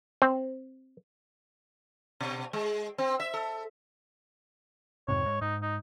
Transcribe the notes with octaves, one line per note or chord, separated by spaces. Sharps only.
C4
B2
G#3
C4
E5
A4
F2 G#2 C3 C#5
G#2
G#2 D#4
D#4